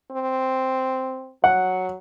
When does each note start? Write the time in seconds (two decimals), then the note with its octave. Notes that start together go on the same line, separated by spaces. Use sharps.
0.11 C4
1.44 F#3 F#5